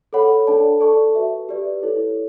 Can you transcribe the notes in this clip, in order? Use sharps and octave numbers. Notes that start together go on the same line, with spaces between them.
A4 C#5 F#5 B5
D4 A4 D5 A5
A4 D5 A5 C#6
F#4 B4 E5
G4 B4 D5
E4 A4 C#5